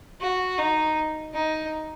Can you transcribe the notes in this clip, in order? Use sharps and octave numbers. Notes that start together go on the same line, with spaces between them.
F#4
D#4
D#4